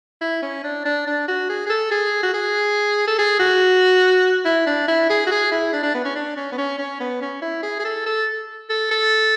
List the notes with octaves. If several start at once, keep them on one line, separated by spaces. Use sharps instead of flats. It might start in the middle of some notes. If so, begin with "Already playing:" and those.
E4
C#4
D4
D4
D4
F#4
G#4
G#4
A4
G#4
F#4
G#4
A4
G#4
F#4
E4
D4
E4
G#4
F#4
G#4
E4
D4
D4
B3
C#4
D4
C#4
B3
C#4
C#4
B3
C#4
E4
G#4
G#4
A4
A4
A4
A4